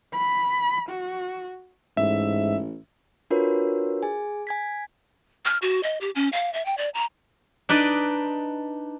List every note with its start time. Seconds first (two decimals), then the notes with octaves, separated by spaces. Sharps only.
0.14 B5
0.89 F#4
1.97 A1 G#2 E5
3.30 D4 F4 F#4 A#4 B4 C#5
4.03 G#4 G#5
4.47 G#5 G#6 B6
5.45 F6
5.62 F#4
5.83 D#5
6.01 G4
6.15 C#4
6.33 F5
6.53 E5
6.65 G5
6.77 D5
6.94 A#5
7.69 D4 D#4 B4 D5 D#5